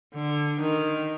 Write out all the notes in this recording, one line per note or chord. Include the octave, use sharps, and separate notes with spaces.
D3
D#3